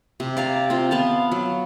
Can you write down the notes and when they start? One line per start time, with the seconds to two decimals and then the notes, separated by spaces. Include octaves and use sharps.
0.20 C3
0.37 D5 F5 A#5
0.70 C4 F4
0.91 B3 F5 A5
1.32 F#3